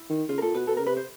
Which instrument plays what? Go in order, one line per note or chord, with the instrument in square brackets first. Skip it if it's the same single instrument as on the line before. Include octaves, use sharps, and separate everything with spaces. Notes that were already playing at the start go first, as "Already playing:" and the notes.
Already playing: [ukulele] E4
[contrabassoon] D#3
[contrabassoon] C#3 [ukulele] F4
[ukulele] A#4
[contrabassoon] A#2 [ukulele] A4
[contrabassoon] B2 [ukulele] B4
[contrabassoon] B2 [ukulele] A4
[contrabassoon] C#3 [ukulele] A#4
[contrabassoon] C3 [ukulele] B4
[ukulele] C5